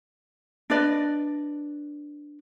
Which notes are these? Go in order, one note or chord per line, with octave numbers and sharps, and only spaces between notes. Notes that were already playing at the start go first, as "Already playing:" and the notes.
D4 B4 D5 D#5